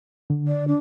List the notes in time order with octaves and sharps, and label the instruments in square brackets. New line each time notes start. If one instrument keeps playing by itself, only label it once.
[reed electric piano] D3
[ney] D5
D4